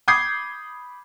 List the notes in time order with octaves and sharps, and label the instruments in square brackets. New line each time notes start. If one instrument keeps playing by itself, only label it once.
[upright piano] B5 D6 D#6 G6 G#6 C7